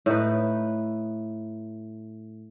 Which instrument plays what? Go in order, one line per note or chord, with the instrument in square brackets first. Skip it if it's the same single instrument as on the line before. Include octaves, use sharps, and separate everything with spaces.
[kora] A2 D#4 B4